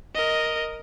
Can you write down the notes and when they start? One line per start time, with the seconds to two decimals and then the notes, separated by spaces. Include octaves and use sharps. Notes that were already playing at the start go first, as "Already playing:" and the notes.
0.15 A#4 D#5